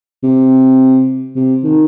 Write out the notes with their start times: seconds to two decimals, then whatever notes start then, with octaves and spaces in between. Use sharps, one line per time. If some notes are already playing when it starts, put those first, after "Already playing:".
0.23 C3
1.36 C3
1.64 D#3